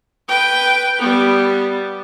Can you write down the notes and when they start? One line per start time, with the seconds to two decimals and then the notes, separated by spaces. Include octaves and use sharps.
0.28 B4 G5
0.98 G3 B3